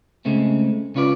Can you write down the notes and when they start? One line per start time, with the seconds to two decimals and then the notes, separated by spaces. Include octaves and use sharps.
0.25 C#2 C#3 G#3 A3 C4
0.95 C#2 C#4 F4 B4 D5